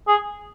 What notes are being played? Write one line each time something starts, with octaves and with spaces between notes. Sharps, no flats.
G#4